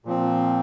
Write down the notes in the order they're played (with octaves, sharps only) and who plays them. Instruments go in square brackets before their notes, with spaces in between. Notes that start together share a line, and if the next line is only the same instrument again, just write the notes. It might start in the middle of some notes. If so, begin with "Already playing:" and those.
[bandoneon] A#2 F3 C4